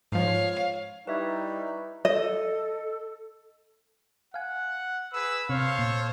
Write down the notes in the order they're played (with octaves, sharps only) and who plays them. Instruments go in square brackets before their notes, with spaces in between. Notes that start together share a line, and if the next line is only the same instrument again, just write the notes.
[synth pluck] G#2 F3 [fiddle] C#5 F5
[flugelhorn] G3 [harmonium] D#4 E4 [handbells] B4 E5 G#6 [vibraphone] C#6
[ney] A4 [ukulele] D#5
[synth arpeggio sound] F5 G#5 [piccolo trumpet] F#5
[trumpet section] G#4 B4 [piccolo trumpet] E6
[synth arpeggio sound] C3 [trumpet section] A4 C5 C#5 [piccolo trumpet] F5
[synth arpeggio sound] A#2